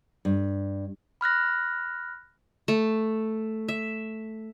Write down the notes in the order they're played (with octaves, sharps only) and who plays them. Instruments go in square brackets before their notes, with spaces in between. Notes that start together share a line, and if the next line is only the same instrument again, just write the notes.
[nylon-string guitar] G2
[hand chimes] B5 F6 F#6 A#6
[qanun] A3
E5